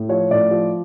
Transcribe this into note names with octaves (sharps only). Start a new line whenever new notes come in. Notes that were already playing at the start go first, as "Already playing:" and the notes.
Already playing: A2
F3 C#5
A2 D5
F3